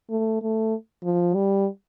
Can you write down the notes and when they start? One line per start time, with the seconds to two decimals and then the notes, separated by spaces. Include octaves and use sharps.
0.10 A3
0.42 A3
1.04 F3
1.35 G3